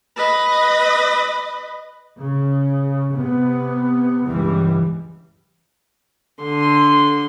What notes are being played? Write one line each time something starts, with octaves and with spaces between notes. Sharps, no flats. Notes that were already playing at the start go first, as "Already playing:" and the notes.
B4 D#5
C#3
C3 B3
C#2 G2 E3 G3
D3 C6